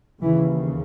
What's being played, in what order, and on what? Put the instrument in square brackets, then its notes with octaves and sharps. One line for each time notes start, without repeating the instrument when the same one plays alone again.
[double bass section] D#2 C#3 E3